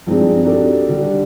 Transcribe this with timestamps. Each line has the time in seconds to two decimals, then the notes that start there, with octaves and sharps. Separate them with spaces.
0.06 G2 F3 G#3 C4 D4 D#4
0.44 D4 D#4 F#4 G4 A4
0.89 D3 G3